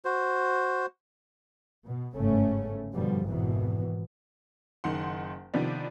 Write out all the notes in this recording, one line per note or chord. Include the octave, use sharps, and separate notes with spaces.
F#4 C5
B2
G1 G#2 C#3 A3 C#4
G2 B2 D3 F3 G3
G#1 F2 G#2 B2 E3
F#1 D#3 F#5 C6
C3 D#3 F3 B3 D4